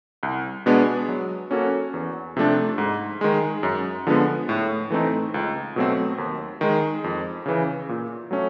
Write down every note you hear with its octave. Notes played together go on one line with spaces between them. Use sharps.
C2
B2 G#3 B3 D4
F#3
A#3 C#4 F#4 A4
E2
C3 F3 A3 D4
G#2
D#3 G#3
F#2
D3 F3 G#3 B3
A2
E3 A3 C4 D#4
C#2
B2 F#3 A3 C4
D#2
D#3 G#3
F2
C#3 E3
A#2
F#3 A3 C#4